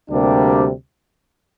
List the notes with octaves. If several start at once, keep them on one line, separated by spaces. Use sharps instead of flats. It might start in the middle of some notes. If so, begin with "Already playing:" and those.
D2 C3 G3 A#3 D4